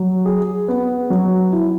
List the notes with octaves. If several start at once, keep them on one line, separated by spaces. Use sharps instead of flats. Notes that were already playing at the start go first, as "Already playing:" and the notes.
Already playing: F#3
G#4
B3
F#3
E4